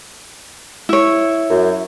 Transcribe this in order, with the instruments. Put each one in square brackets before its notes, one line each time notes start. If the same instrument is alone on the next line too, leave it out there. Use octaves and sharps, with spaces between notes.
[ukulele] E4 C#5
[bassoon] F#2